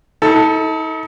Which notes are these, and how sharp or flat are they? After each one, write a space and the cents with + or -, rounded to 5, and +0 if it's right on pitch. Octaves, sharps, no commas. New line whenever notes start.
D#4 +45 A4 +5